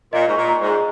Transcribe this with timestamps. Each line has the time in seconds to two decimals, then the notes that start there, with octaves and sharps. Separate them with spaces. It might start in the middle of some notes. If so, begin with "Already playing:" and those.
0.13 A#2 D#5
0.27 G#2 C#6
0.36 A#2
0.48 A#5
0.61 G#2
0.67 G#4